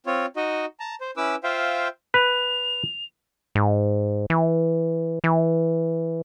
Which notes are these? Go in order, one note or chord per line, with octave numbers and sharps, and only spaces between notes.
C4 F4 C#5
D#4 F#4 D#5
A5 A#5
C5
C#4 E4 B4 D6 E6
F4 C5 E5 F5 G5
B4 F7
G#2
E3
E3